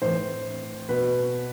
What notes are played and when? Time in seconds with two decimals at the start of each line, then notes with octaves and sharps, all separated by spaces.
0.02 A2 E3 C5
0.89 B2 B4